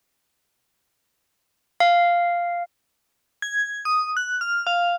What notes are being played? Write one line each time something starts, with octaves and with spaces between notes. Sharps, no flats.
F5
G#6
D#6
F#6
F6
F5